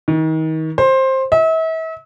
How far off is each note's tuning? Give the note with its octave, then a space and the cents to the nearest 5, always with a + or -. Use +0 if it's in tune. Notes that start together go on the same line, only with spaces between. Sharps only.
D#3 +35
C5 +15
E5 -40